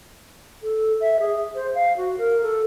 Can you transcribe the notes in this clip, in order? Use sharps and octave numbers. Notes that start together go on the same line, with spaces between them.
A4
E5
G#4
C5
F5
F#4
A#4
A4